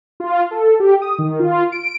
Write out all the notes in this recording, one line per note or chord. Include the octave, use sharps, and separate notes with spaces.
F4
A4
G4
D#6
D#3
F4
D7